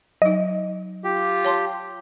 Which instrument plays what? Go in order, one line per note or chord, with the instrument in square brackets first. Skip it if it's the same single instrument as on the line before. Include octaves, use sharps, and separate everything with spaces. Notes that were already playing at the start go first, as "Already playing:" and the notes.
[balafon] F#3 D#4 [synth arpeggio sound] D#5
[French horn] F4 [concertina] G4
[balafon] C#5 A5 C6